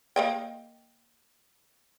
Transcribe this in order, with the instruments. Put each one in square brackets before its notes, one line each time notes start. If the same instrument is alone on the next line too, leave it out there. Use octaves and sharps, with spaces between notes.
[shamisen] A#3 D#5 G5